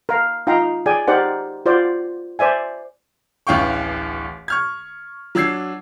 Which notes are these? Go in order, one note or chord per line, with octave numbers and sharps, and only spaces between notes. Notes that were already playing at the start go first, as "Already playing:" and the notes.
A#4 F5
D#4 F4 F5 G5 A#5
G#4 D5 G5 G#5
D#4 G4 A#4 C5 D5 F#5
F4 F#4 C5 D5
C5 D5 E5 G#5
D1 A1 E3 F5 G5 C#6
C#6 F6 G#6
F#3 D4 E6 G#6 C7